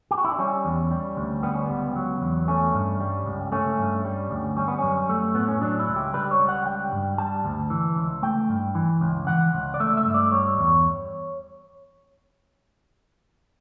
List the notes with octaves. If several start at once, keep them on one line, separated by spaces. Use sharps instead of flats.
G4
F#4
E4
D4
G3 C#4
E2
G3
D2
G3 B3
C#4
C#2 B3
F#3
E2
A3 C#4
G2
G3
C#2
A3 C#4
G2
G3
D2
G3 C#4
B3
F#2 C#4
A3
A2 B3
C#4
F#3 D4
E4
C#2
G4
G3 B4
C#5
C#2
F#5
G3 G5
G2
G3 A5
D2
E3
C#2
A3 G5
G2
E3
C#2
E3 F#5
C#2
D5
A3 E5
E5
G2
D5
G3 C#5
E2